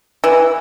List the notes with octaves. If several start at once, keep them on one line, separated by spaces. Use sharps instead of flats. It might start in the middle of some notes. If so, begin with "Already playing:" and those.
E3